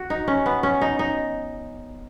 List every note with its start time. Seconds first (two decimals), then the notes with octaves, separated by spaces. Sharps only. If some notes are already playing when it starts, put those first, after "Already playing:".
Already playing: F#4
0.10 D#4
0.28 C#4
0.46 B3
0.63 C#4
0.81 D#4
0.99 D#4